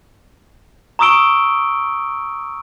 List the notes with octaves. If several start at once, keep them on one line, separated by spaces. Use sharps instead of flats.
A#5 C#6 D#6 E6 D7 G7